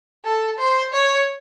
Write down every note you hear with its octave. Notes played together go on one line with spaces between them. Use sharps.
A4
C5
C#5